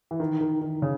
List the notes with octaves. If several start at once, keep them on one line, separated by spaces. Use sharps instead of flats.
E3
D#3
D#3
D#3
C#3